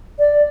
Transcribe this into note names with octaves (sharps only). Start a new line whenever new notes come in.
D5